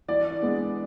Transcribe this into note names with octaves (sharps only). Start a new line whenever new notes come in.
E3 D5
G#3 B3